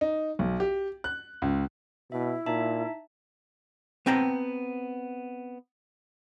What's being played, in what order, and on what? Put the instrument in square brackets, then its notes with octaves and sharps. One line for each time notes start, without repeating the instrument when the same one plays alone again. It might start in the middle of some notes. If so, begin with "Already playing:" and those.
[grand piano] D#4
B1
G4
F#6
C#2
[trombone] B2 [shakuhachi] E4 [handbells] E5
[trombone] A#2 [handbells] D#4 E5 A5
[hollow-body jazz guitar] B3 C4 G5 A5 A#5